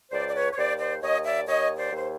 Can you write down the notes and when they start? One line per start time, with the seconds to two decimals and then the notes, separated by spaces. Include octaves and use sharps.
0.11 C#2 C5 D5
0.28 D5
0.34 B4 C#5
0.52 C#5
0.57 D#2 C5 D5
0.79 C5 D5
1.02 D#2 C#5 D#5
1.24 D5 E5
1.47 D#2 C#5 D#5
1.77 C5 D5
1.92 D#2 C5